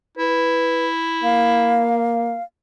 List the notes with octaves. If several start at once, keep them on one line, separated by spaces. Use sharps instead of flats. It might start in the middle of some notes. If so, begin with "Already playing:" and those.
E4 B4
A#3 F5